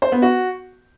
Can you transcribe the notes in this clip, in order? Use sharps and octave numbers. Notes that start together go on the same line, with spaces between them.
C5
B3
F#4